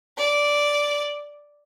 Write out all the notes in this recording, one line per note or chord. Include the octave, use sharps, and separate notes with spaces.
D5